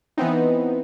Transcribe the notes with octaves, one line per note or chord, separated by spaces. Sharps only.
E3 B3 C4 D#4